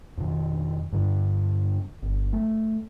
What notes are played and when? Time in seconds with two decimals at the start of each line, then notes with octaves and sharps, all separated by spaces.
0.18 F2 B2 D#3
0.93 G2 D3
2.02 G1
2.33 A3